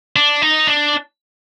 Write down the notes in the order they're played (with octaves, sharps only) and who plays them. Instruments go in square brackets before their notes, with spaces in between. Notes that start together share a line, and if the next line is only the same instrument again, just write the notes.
[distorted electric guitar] D4
D#4
D4